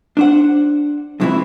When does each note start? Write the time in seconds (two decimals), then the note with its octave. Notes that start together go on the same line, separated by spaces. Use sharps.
0.17 D4 C5 F#5
1.20 F2 C#3 E3 G#3 C4 E4